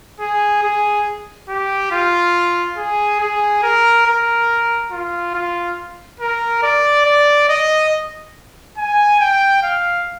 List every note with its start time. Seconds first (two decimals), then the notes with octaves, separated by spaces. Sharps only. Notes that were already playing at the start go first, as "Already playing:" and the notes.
0.20 G#4
0.63 G#4
1.49 G4
1.92 F4
2.77 G#4
3.20 G#4
3.63 A#4
4.06 A#4
4.91 F4
5.34 F4
6.20 A#4
6.63 D5
7.06 D5
7.49 D#5
8.77 G#5
9.20 G5
9.63 F5